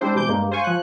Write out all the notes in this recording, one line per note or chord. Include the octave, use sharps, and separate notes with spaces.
G3 G#3 C4 D4 E4 C5
B2 E3 D6 G6
G2 G#3 A#3
C5 F5 G#5 C#6
F3 F#6